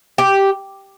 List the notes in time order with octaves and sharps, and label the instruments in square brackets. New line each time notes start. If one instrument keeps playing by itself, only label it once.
[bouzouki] G4